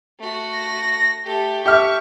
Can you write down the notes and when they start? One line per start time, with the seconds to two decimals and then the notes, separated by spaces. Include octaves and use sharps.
0.19 A3 F#4
0.53 A#6
1.25 A3 G4 A4
1.66 G4 E5 C#6 F6